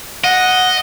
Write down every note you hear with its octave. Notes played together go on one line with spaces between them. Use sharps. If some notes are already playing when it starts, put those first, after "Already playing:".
D#5 F#5